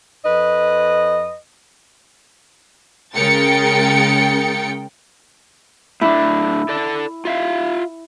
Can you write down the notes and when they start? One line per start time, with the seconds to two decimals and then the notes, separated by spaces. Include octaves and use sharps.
0.25 F2 B4 D#5
3.15 C#3 G#3 A#4 G5 A6 C#7
6.01 A2 D4 E4
6.69 A4 D5
7.25 F4 E5 F5